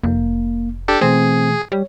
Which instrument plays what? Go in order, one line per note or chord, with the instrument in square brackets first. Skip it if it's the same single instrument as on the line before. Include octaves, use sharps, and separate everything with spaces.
[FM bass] F1 [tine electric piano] A#3
[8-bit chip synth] D4 G4 A4
[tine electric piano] B2 E3 A3 [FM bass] C4 [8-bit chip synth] G#4
[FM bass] G3 [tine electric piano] C#5